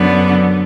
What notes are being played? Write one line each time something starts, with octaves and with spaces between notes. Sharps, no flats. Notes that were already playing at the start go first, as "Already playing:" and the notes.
Already playing: F#2 D3 F#3 B3